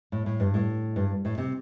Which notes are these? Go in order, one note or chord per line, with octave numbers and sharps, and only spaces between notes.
A2
A2
G2
A2
G2
A2
C3